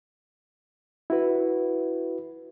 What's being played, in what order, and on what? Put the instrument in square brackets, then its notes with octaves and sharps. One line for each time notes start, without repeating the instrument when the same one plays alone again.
[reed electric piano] E4 F#4 B4